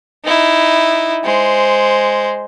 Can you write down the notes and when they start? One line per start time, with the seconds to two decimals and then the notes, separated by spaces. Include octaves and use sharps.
0.25 D#4 E4
1.24 G#3 C5